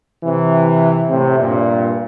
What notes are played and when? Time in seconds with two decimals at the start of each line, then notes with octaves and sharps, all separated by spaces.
0.24 C3 E3
1.10 A2 C3
1.40 G2 A#2